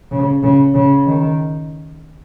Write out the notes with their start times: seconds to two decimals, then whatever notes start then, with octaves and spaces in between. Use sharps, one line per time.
0.11 C#3
0.43 C#3
0.74 C#3
1.06 D#3